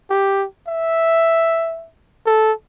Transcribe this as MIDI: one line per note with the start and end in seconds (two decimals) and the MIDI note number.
0.10 0.46 67
0.67 1.88 76
2.26 2.52 69